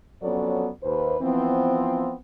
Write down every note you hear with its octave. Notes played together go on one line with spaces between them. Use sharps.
F2 F#3 B3 C#4 A4 D5
D#2 B4 C5
E3 F3 B3 C4